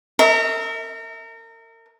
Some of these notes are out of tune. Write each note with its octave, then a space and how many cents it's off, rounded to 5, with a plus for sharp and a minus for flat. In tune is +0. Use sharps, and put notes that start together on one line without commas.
A#4 -35 E5 -30